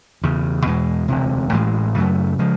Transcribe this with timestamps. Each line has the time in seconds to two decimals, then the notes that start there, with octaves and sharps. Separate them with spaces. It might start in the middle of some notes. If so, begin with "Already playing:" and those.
0.21 E1 E2 C#3
0.65 E2 B2 G#3
1.08 E1 D2 C3
1.52 A1 A2 E3 G#3
1.95 F#2 C#3 F#3 A3
2.39 C#3 F3 G#3